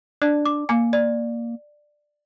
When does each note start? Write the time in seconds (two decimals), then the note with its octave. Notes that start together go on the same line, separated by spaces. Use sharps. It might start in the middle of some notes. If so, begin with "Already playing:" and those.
0.22 D4 D5
0.46 D6
0.69 A#3 G#5
0.93 D5